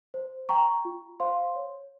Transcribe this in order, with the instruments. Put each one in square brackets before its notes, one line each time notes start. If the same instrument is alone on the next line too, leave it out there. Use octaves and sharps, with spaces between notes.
[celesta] C5
G5 A#5 C#6
F4
C5 F5 C6
C#5